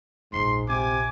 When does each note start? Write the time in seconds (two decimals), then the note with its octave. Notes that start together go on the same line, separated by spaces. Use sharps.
0.33 E1 A#1 G#2 C6
0.69 C3 G#5 D6